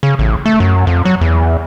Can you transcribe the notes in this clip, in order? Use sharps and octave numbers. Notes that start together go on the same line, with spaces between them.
C#3
A1
A3
F#2
F2
F#3
E2